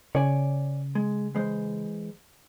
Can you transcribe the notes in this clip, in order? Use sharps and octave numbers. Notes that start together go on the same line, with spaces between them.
C#3 C#5 D5 G#5
G#3
E3 G#3 C5